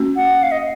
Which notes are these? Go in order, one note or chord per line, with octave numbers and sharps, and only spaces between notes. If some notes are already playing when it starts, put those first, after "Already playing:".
Already playing: A#3 C#4 F#4
F#5
F5
D#5